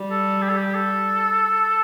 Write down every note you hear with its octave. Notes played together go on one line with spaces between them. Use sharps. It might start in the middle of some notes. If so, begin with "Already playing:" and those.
Already playing: G3
A4
G4
A4
G4
A4